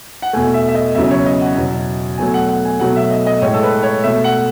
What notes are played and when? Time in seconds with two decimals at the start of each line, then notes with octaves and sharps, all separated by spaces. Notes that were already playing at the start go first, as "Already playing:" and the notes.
0.22 F#5
0.33 E2 B2 A3 G#5
0.54 E5
0.68 E5
0.74 D#5
0.95 E2 C#3 F#3 E5
1.11 C#5
1.26 D#5
1.41 F#5
1.56 E2 B2 F#3
2.18 B2 F#3 A3 G#5
2.34 F#5
2.49 F#5
2.65 G#5
2.80 B2 F#3 A3 F#5
2.96 E5
3.11 D#5
3.26 D#5
3.42 A2 G#3 C#5
3.54 A4
3.63 B4
3.83 C#5
4.03 B2 A3 E5
4.24 F#5